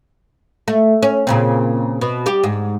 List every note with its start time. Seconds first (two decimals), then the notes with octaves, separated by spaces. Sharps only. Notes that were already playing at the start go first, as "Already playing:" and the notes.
0.68 A3
1.03 C#4
1.27 A#2 C#3 C4
2.01 B2
2.26 G3 G4
2.44 G#2